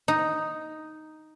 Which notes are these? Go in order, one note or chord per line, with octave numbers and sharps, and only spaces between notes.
D#4